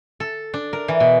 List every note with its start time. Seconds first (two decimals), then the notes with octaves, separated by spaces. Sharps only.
0.20 A4
0.54 D4
0.73 A#4
0.88 E3
1.00 B2